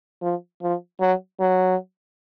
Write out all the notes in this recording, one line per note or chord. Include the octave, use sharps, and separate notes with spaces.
F3
F3
F#3
F#3